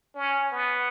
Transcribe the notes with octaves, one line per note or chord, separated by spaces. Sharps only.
C#4
B3